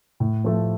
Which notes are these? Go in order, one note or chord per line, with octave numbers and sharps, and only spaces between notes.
A2
F3 A3